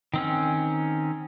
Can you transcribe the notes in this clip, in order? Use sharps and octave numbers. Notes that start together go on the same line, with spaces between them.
D#3 C4 C#4